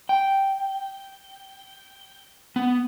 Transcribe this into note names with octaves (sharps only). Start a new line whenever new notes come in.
G5
B3